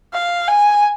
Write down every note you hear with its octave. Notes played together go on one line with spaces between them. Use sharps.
F5
G#5